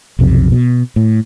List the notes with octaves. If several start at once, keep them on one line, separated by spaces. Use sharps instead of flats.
B1 F2 C3
B2
A2